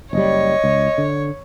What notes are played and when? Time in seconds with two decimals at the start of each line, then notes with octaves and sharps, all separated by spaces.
0.13 F#1 G3 C#5 D#5
0.64 C#2
0.98 D3